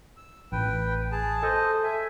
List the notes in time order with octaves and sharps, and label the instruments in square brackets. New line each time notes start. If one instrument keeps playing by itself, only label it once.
[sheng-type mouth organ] E6
[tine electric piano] A1 [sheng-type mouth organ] B4 G5
[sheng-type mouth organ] G#4 A5
[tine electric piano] A4 [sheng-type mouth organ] C5 D#5
[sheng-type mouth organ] E5 G#5